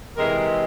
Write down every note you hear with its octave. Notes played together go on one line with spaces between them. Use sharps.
C3 E3 G#3 G#4 A#4